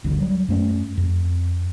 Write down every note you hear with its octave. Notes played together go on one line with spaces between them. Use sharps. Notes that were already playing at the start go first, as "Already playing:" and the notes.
D1 G1 D2
F#3 G3
F#2 A3 C#4
F2